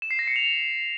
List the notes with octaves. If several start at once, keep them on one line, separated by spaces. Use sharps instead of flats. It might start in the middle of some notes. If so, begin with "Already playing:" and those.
E7
C7
A#6
C#7
F7